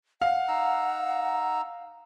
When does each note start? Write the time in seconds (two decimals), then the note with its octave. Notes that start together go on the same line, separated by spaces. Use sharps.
0.21 F5 F#5
0.48 D#4 A#5 E6